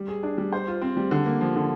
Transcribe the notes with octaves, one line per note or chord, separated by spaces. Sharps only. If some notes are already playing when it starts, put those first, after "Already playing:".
Already playing: G3
G#4
D4
G3
C5
F4
C4
G3
D3
A#3
F3
D3